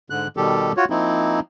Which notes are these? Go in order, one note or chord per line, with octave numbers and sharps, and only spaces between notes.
G#2 D3 F#6
B2 D#3 G3 G4 A4
F4 F#4 C#5
F3 A#3 C4 D#4 E4